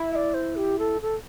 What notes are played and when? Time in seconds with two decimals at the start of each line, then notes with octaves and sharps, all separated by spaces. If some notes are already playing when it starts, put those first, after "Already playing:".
Already playing: E4
0.11 E5
0.15 D5
0.34 C5
0.56 G4
0.79 A4
1.02 A4